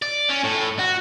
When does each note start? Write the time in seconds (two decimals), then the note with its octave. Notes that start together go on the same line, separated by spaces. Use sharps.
0.02 D5
0.30 C#4
0.44 A2
0.79 F#4